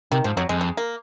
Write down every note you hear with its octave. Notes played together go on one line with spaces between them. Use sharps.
C3 D#3
G#2 F3
F2 F#3
F2 G#3
G#3
A#3